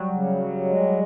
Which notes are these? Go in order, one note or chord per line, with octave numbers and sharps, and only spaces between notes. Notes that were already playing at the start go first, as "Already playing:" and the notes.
Already playing: F#3 G3
C#3
F#3
G#3